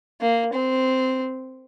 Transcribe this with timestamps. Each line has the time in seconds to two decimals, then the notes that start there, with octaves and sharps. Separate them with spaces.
0.21 A#3
0.53 C4